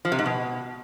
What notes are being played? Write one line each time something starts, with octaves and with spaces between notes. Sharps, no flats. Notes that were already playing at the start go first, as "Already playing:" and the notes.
F3
C3
G#2
B2